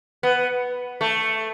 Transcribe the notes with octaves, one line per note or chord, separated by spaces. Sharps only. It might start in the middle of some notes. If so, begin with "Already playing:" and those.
B3
A3